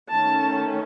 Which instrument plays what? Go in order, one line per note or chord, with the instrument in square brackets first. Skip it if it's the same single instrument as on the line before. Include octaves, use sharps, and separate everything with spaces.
[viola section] D#3 A3 C#4 A5